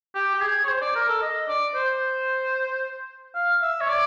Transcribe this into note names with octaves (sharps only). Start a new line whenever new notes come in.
G4
G4
G#4
C#5
C5
D5
A#4
A4
D#5
D5
C5
F5
E5
C#5
D5